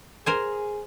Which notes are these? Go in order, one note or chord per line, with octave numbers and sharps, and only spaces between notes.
G#4 A#4 C5 G#5